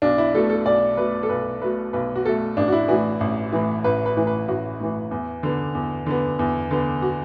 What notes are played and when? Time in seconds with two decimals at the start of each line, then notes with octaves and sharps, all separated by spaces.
0.02 B1 D4
0.18 E4
0.34 B2 A3 A4
0.50 A4
0.66 B1 D5
0.97 B2 A3 B4
1.23 A4
1.29 B1 B4
1.62 B2 A3 B4
1.93 B1 B4
2.16 F#4
2.25 B2 A3 A4
2.57 A1 D4
2.68 F#4
2.72 E4
2.88 A2 E3 F#4
3.21 A1
3.53 A2 E3
3.84 A1 B4
4.06 B4
4.16 A2 E3
4.27 B4
4.48 A1 F#4
4.80 A2 E3
5.11 E2
5.43 D3 B3
5.75 E2
6.06 D3 B3
6.39 E2
6.71 D3 B3
7.02 F#4